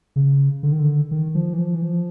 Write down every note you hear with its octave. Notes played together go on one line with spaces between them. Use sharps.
C#3
D3
D#3
D3
D#3
F3
E3
F3
E3
F3